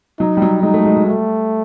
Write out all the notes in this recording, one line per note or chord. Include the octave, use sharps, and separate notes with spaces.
F#3 D#4
G3
F#3
G#3 D#4
A3
G#3
G3
A3